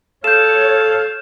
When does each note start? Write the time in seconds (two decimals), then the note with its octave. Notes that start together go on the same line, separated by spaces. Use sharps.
0.24 A4 C#5 F5 G6 E7